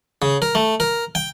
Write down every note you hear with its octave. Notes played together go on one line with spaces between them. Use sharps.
C#3
A#4
A3
A#4
G5